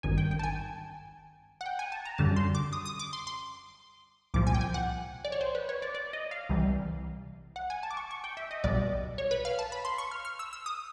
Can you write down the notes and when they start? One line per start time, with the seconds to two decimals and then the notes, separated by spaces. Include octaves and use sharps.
0.03 G#1 G2 D#3 G#5
0.18 G5
0.31 G5
0.39 A5
0.43 G#5
1.61 F#5
1.66 G5
1.79 G#5
1.92 A5
2.05 A#5
2.18 F#2 D3 G3 A5
2.36 C6
2.55 D6
2.73 D#6
2.86 D#6
2.99 D6
3.13 C6
3.27 C6
4.34 C2 A#2 F3 D6
4.47 G#5
4.54 G5
4.61 G#5
4.74 F#5
5.25 D5
5.32 C#5
5.41 C5
5.55 B4
5.69 C#5
5.82 D5
5.95 D5
6.13 D#5
6.31 F5
6.49 C2 C3 E3 G3
7.56 F#5
7.70 G#5
7.83 A5
7.91 D6
7.97 C#6
8.11 C#6
8.24 G5
8.37 E5
8.51 D#5
8.64 B1 B2 G3 D5
9.18 C#5
9.31 B4
9.45 F5
9.59 A5
9.72 B5
9.85 C6
9.98 C#6
10.11 F6
10.25 F6
10.39 E6
10.53 E6
10.66 D#6